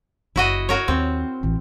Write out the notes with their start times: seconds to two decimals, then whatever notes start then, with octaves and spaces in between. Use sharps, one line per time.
0.36 F#1 E4 F#4 D#5
0.69 F#4 A#4 C#5
0.88 D#2 C4
1.43 A1 E3